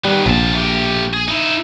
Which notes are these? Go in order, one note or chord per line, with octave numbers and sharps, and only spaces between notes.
D#3 G3 B3
A#1 C3 A5
A3 G4
G#4
D#4 E4